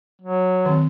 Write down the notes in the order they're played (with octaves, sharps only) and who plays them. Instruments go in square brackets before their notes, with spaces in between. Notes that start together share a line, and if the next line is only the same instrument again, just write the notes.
[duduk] F#3
[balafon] D#3 C4